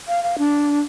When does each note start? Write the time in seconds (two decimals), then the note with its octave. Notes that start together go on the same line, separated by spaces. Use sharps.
0.08 F5
0.23 F5
0.39 D4